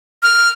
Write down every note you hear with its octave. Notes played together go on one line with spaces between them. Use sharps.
F6